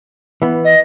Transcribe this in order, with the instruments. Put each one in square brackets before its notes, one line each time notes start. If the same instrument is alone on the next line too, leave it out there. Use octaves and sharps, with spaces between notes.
[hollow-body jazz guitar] E3 B3
[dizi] D#5